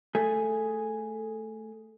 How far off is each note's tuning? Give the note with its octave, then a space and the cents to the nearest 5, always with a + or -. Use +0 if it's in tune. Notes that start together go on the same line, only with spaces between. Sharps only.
A3 +0 G#4 +0